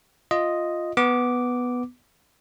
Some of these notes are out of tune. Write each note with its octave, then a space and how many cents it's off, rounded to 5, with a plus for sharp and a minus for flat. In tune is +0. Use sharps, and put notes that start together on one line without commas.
F4 +0 D#5 +0
B3 +0 D6 -5